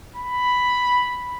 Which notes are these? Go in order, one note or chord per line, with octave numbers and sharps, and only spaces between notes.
B5